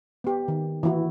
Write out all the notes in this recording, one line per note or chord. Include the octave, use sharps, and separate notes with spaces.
B3 G4
D#3
E3 A#3 E4 F#4